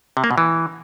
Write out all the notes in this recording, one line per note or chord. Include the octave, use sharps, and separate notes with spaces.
C3
A#3
B2
E3